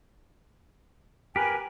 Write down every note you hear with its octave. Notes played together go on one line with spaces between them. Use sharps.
G4 A#4 B4 G#5